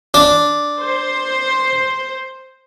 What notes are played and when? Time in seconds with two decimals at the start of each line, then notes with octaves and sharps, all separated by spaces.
0.14 D4
0.79 C5